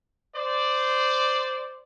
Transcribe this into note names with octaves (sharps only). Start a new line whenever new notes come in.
C5 D5